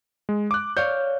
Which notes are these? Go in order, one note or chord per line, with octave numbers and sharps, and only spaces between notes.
G#3
D6 F#6
C#5 D5 F5 G6